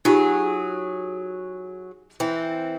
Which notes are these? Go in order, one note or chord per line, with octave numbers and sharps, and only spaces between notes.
F#3 D#4 F4 G4 G#4
E3 C4